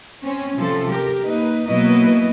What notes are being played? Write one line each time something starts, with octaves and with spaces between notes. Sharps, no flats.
C4 C#4
C3 F3 A4
G4 A#4
A#3 D#4 B4
B2 F#3 A#3 E4 B4 D#5